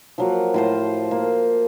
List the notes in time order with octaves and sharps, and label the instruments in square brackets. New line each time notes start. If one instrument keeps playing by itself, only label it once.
[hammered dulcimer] F3 F#3 A#3
A2 F4 C5
A#3